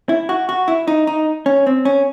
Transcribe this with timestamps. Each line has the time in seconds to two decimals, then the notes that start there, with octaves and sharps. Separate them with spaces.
0.09 E4
0.29 F#4
0.49 F#4
0.68 E4
0.88 D#4
1.07 D#4
1.46 C#4
1.67 C4
1.85 C#4